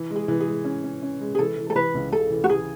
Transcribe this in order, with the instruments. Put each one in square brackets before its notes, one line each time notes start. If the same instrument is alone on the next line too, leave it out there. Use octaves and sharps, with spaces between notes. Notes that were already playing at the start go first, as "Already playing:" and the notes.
Already playing: [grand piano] E3
G#3
[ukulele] G#4
[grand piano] E3
[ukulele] G#4
[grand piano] G#3
C#4
C#4
C#4
G#3
[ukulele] G#4
[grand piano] E3 [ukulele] A4
[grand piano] E3
[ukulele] A4
[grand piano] E3 [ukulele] B4
[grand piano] C#2
[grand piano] C#3 [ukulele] A4
[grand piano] E3
[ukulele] F#4
[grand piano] E3 [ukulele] G#4